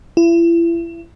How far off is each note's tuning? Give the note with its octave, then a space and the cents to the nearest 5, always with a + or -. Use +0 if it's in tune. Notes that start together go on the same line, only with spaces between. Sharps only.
E4 +35